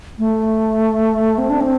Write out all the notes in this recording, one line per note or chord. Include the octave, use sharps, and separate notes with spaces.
A3
C4
D4
C4